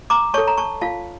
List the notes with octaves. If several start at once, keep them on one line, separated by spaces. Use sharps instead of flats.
A#5 D6
A4 C#5 A5 C#6
A#5
A5 C#6
F4 F5 A5